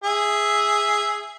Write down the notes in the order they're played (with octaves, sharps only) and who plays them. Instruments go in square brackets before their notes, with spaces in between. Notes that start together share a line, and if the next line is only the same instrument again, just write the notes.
[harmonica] G#4 E5